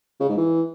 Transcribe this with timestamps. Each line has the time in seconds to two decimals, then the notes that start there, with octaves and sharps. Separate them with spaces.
0.20 C#3
0.29 G#2
0.37 E3